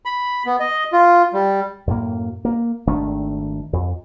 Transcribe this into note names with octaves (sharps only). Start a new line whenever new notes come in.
B5
B3
D#5
F4
G3
F#2 A2 A#3
A#3
G#1 D#3 A3 D4
F2